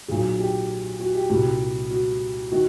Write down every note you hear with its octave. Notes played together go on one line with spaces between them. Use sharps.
B1 A#2 F#3 G#4
G4
F#4
G4
C2 A#2 G3 F#4
F#4
D#3 F#4